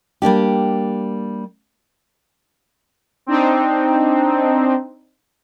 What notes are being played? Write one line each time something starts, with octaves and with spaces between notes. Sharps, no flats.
G3 A#3 D4 G4
C4 D4 D#4